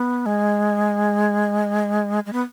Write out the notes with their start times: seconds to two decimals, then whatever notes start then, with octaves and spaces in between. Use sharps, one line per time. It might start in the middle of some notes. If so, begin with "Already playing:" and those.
Already playing: B3
0.26 G#3
2.26 G#3
2.33 B3